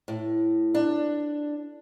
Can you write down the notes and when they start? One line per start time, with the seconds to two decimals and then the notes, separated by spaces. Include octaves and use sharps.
0.08 A2
0.75 D4